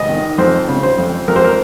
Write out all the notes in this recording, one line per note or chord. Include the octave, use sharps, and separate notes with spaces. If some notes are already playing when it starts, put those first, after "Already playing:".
Already playing: C#2 D#5
D#3
F2 C5
C#3
C5
F2
F2 A#4
C5
A#4